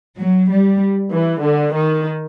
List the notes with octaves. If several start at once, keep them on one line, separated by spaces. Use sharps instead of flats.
F#3
G3
E3
D3
D#3